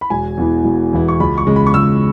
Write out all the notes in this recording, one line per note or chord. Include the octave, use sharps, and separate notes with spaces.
B5
E1 G#5
E2 E3 B3 E4
E1
E2 E3 B3 E4
C#6
C#2 B5
C#6
C#3 G#3
B5
C#6
C#2 E6